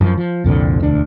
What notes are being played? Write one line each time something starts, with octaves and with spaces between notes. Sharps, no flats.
F#2 E3 F3
F3
C2 F2 A#2 D3
E1 D2 D4